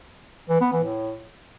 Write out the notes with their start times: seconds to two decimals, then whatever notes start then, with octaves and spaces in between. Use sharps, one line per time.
0.49 E3
0.61 B3
0.72 E3
0.84 A2